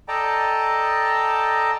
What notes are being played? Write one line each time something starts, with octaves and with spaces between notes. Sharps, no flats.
A4 D5 D#5 G5 A5 A#5